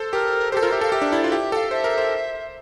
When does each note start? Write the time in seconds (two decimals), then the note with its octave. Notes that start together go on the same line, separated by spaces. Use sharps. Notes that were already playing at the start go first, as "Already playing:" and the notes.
Already playing: A4 C5
0.13 G4 A#4
0.52 G4 A4 C5
0.62 F4 A#4
0.71 G4 E5
0.81 A4 F5
0.92 G4 E5
1.02 D4
1.12 E4 D5
1.24 F4
1.31 G4 E5 F5
1.52 A4 G5
1.57 F5
1.71 C5 E5
1.84 A#4
1.98 C5